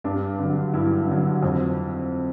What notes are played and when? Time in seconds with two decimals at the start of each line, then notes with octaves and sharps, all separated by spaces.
0.04 G2 D4
0.39 D3 F#3
0.74 G2 E4
1.08 D3 F#3
1.43 F2